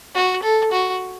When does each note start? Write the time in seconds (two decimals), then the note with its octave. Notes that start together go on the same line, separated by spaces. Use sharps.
0.15 F#4
0.43 A4
0.72 F#4